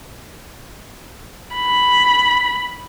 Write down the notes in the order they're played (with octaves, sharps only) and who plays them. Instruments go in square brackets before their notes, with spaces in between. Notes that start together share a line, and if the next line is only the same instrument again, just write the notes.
[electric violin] B5